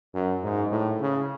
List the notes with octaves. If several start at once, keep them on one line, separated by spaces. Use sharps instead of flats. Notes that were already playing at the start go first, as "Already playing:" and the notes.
F#2
G#2
A2
C#3